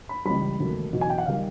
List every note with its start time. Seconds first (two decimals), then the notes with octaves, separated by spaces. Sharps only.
0.09 B5
0.25 C#2 C#3 E3 G3 B5
0.59 E1 D#2 C#3 F#3 A3
0.93 E2 B2 F#3
1.01 G#5
1.10 G5
1.18 F#5
1.26 D#3 G3 F5